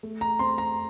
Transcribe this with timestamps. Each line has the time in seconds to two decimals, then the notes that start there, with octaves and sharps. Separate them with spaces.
0.03 A3
0.21 A#5
0.39 C4 C6
0.58 A#5